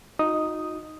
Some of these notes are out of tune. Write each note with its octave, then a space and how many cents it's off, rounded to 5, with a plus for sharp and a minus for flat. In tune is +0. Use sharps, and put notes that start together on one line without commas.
D#4 +0 F#4 -45 D#6 +0